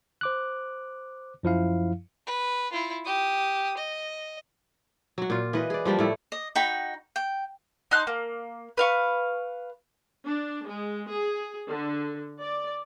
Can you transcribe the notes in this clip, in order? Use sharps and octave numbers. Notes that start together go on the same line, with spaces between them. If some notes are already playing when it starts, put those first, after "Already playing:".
C5 D6 F#6
F#2 F3 E4 F5
B4
E4 F4
G4 D#6
D#5
F#3 F#4
A#2 F4
E3 B4 D#5
G#4 D5
F3 G3 A#3 D4
A2 A3 E4
D#5
D#4 F#4 G5 B5
G5
D#4 A5 C6 F#6
A#3
B4 F5 C#6
D4
G#3
G#4
D3
D5